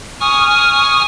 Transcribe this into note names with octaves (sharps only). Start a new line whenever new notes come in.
G#5 C#6 D#6 F6